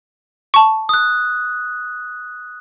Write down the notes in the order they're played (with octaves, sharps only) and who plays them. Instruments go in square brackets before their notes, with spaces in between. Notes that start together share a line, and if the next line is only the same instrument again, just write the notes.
[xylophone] A5 C#6
[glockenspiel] D#6 F#6